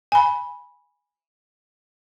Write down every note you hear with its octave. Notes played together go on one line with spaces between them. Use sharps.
G#5 B5